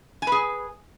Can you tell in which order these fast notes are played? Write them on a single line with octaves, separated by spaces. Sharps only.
G#5 B4 G#4